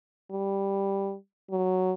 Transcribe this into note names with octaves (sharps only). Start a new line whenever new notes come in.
G3
F#3